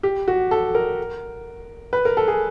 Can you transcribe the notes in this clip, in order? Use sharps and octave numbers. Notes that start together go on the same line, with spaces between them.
G4
F#4
A4
A#4
B4
A#4
A4
G#4